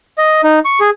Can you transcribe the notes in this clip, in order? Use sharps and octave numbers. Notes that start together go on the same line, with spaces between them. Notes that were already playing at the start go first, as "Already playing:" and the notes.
D#5
D#4
C#6
G#4